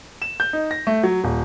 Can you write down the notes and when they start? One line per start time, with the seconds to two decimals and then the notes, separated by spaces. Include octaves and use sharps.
0.22 E7
0.40 G6
0.53 D#4
0.71 A#6
0.87 A3
1.04 F#3
1.24 D#1